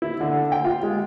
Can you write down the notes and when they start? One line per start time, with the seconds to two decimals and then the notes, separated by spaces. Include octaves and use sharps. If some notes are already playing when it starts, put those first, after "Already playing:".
0.02 E4
0.21 D3
0.52 G5
0.64 F4
0.83 G#3